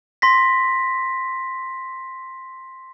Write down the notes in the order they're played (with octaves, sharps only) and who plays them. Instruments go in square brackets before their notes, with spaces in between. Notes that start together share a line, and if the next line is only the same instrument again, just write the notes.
[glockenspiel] C6 A#6 B6